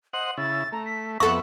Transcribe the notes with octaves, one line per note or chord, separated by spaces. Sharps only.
C5 D#5 F#5 F#7
C#3 E4 A6
A3 A#5
B6
F2 B3 A4 E5 F#5 C#6 A#6